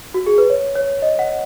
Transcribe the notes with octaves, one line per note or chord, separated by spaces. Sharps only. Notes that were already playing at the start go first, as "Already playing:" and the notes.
F#4
G#4
B4
C#5
C#5
D#5
F#5